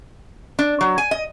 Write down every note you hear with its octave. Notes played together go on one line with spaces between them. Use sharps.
D4
F#3
G#5
D#5